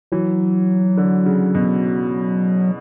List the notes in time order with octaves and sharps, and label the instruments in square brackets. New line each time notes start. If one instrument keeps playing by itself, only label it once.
[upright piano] E3 [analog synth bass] F#3
[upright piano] D3
C#3
B2